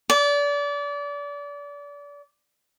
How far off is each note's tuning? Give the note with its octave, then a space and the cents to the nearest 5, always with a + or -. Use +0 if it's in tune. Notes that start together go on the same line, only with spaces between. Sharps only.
D5 -30